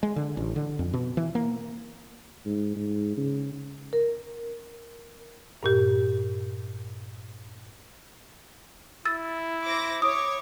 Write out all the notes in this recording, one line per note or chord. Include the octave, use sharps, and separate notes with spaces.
G#3
D3
A1
D3
F2
B2
E3
A#3
G#2
G#2
C#3
A#4
G2 A#2 G4
E4 E6 A6
C5 D6 A#6
C#5 D6 D#6